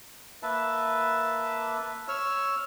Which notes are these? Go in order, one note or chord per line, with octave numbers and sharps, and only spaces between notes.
A#3 B4 E5 A5
C#5 E6 F6